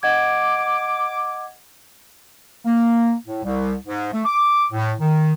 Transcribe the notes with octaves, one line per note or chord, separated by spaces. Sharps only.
D#5 F#5 D6 G#6
A#3
A2
C2
G#2
A3
D6
A2
D#3